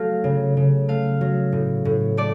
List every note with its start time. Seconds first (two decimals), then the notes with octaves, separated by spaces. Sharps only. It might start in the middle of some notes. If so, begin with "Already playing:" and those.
Already playing: F#3 A3 F5
0.24 C#3
0.57 C#3
0.88 A3 F5
1.21 F#3
1.52 A2
1.85 A2
2.17 A3 D5